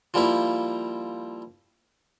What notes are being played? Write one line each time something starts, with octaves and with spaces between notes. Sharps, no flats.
F3 G3 A#3 E4